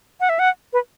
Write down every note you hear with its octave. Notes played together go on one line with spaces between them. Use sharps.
F#5
E5
F#5
B4